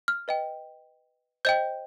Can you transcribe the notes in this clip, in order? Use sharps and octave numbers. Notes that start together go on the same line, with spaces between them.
F6
B4 D#5 G5
C5 D#5 G5 G6